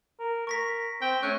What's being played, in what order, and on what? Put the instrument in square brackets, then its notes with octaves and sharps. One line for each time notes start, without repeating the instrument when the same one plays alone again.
[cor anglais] A#4
[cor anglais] A#4 [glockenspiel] C#6 A#6 B6
[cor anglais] C4 [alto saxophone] G5
[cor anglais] A3 [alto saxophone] C#4 [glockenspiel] C#6 F#6